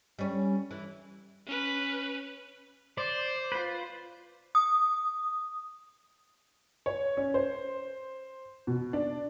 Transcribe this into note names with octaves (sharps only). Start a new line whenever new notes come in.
G3 C#4
E3
C#4 B4
C5 D5
F4 B4
D#6
C#5
C#4
C5
B2
D4